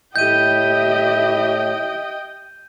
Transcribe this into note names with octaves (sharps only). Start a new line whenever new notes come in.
A2 G4 D#5 E5 G5 G6 D#7